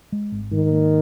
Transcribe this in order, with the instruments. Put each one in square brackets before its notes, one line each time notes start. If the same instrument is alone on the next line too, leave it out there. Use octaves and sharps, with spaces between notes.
[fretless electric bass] G#3
G#1
[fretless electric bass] G#2 [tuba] D#3
[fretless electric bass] A#3